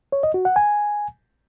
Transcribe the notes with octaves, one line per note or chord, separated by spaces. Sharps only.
C#5
D#5
F#4
F#5
G#5